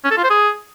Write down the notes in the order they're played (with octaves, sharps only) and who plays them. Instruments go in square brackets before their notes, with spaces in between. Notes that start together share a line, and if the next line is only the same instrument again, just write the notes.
[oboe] C#4
A4
F4
C5
G#4